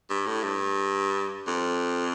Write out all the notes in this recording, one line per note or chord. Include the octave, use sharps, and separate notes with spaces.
G2
A2
G2
F2